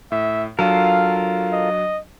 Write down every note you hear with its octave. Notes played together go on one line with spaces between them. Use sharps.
A2 E5
F#3 D4 F4 A4 A#4 F5 D#7
D#5